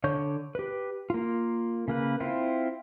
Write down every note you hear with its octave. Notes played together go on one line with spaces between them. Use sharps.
D3 C#5 C#6 G6
G4 B4
A#3 F4
C#3 A#3 B4
C4 E4 F4